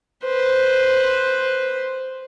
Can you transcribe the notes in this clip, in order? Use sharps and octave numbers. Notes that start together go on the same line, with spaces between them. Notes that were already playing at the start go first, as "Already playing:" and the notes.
B4 C5